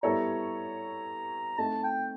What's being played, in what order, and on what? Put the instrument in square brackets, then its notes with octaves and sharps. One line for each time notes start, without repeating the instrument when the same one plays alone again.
[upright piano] G3 B3 E4 A4 C#5 [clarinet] A#5
[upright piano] A3 C4 D#4 [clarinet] A5
[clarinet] G5